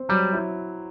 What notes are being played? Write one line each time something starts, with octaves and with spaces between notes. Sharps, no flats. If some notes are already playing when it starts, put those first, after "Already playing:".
Already playing: C4
F#3 G3
E4